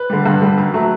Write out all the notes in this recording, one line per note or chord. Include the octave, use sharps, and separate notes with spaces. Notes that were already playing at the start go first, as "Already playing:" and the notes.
Already playing: B4
D3 G3
G2
D3 G3
F#2
F#3 A3